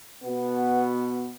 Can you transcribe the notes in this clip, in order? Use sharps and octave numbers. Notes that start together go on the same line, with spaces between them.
B2 B3